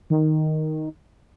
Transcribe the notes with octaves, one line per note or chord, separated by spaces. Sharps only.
D#3